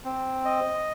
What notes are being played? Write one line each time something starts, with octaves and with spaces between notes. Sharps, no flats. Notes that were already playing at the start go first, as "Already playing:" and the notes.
C4
D#5